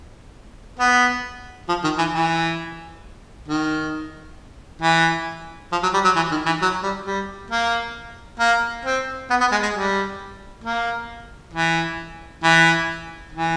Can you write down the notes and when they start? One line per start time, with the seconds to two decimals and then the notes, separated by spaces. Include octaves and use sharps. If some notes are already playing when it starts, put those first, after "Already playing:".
0.79 B3
1.69 F3
1.84 D#3
1.98 E3
2.13 E3
3.48 D#3
4.81 E3
5.72 F3
5.83 F#3
5.94 G3
6.05 F#3
6.16 E3
6.31 D#3
6.46 E3
6.61 F#3
6.83 G3
7.05 G3
7.50 A#3
8.39 A#3
8.85 C4
9.30 B3
9.41 B3
9.52 G#3
9.63 G#3
9.74 G3
10.64 A#3
11.53 E3
12.43 E3
13.33 E3